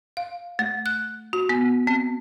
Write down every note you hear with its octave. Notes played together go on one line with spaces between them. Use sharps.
F5
A3
F#6
F#4
B3
C4